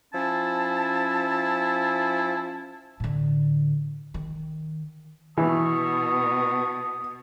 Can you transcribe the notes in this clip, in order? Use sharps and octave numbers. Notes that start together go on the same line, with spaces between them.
F3 C#4 E4 A5
A2 D3
D#3
B2 E3 A5 C#6 D#6